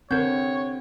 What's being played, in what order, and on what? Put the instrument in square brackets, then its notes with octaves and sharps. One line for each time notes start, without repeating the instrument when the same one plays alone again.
[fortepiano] D3 [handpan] C4 [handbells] A#4 G6 [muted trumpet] C#5